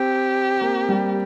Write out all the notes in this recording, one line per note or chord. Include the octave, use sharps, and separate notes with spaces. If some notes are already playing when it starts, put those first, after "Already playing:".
Already playing: C4 G4
A#3
G3